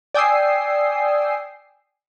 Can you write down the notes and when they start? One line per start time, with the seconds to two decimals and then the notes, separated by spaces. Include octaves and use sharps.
0.14 D5 G5 G#5 D#6 E6 C7